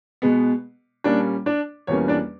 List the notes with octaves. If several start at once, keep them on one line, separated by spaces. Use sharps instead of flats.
B2 G#3 B3
A#2 G3 A#3 C#4 D4 D5
D4 D5
E2 B2 G3 A#3 C#4 C#5
D4 D5